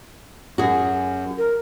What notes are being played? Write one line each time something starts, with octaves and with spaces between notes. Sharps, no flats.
F#2 F#4 G#4
A#4